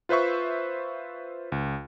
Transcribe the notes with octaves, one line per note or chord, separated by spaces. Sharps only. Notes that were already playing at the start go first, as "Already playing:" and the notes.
F4 B4 C5 E5 C#6
C#2